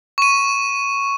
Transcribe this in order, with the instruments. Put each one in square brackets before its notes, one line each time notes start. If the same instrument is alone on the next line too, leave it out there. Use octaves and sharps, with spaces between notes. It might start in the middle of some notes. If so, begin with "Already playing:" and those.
[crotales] C#6 D#7